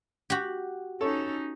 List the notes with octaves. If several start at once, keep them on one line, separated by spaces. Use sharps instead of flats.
F#4 G4
C#4 D#4 A4 C#5